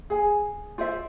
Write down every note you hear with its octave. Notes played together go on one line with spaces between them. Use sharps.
G#4 G#5
F4 C5 D5 E5